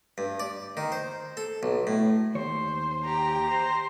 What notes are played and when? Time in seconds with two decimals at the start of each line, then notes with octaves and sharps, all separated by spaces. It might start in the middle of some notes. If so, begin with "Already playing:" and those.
0.18 G2
0.40 D5
0.77 D#3
0.92 C5
1.37 A4
1.63 B1
1.87 A2
2.35 D#2 C5 C#5
3.05 G4 A#5
3.50 C5